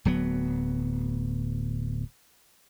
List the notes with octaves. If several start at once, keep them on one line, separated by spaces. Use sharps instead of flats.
D1 F#3 B3